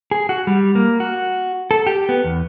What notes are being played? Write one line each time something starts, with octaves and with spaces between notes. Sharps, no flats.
G#4
F#4
G3
A#3
F#4
A4
G4
B3
E2